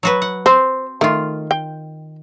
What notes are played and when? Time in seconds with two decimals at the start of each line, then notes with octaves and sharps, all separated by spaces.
0.03 F#3 F#4 B4
0.22 F#5
0.46 C4 C5
1.01 D#3 A3 F4
1.51 G5